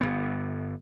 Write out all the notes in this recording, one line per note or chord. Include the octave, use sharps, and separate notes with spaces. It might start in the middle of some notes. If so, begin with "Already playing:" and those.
G1 E2 B3